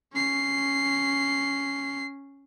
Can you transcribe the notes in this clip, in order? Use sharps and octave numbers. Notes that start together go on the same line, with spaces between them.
C#4 C7